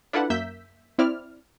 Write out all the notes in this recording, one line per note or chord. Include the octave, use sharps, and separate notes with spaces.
D4 E4 F4 A4 B4 F#5
F#2 A#3 E5 E6 G6 B6
C4 E4 D5 F6